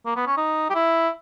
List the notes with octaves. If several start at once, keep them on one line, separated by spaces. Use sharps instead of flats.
A#3
B3
C#4
D#4
G4
E4